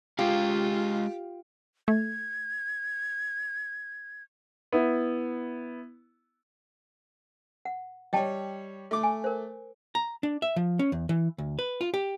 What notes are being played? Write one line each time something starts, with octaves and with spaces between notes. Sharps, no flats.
G#3 F4 G4 G#4 F5
A3 G#6
B3 E4
F#5
G3 C#5 D#5 G5 A5
A3 D6
G#5
A#4 C5
A#5
D4
E5
F3
C#4
E2
E3
D2
B4
F4
G4